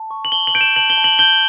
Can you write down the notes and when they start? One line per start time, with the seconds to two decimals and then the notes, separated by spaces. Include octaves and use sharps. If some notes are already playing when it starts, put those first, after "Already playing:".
Already playing: A5
0.11 C#6
0.25 F#7
0.32 A5 G7
0.47 F#7
0.54 G6 D7
0.61 E7
0.76 A5 F#7
0.90 G7
0.97 A5
1.04 F#7
1.19 G6 G7